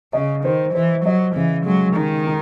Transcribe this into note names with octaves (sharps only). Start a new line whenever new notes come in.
C#3 D#5
D#3 C5
E3 C5
F#3 D#5
C#3 E3
F#3 G#3
D#3 D#4
D#4